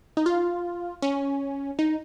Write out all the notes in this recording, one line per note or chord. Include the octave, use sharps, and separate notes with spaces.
D#4
F4
C#4
D#4